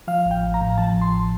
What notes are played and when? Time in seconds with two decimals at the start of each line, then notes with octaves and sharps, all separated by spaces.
0.07 F3 F5
0.26 A1
0.31 G5
0.43 A1
0.54 A#5
0.61 A2
0.78 F3 A5
0.97 A1 C6